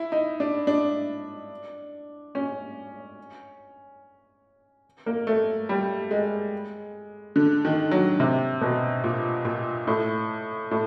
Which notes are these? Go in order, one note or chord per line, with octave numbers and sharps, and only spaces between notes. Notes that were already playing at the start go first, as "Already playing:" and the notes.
Already playing: E4
D#4
D4
D4
C#4
A#3
A3
G3
G#3
D3
D#3
F#3
C3
B2
A#2
A#2
A2
A2